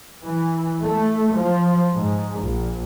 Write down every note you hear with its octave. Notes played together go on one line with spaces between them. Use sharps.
E3
A3
F3
G#2
A#1